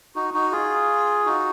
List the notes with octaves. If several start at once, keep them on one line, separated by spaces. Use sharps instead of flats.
D#4 F#4
D#4 F#4
F4 G#4
D#4 F#4